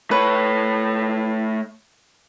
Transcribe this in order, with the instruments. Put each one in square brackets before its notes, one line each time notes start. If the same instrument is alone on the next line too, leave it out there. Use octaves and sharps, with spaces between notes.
[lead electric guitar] A3 C#5 [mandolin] B4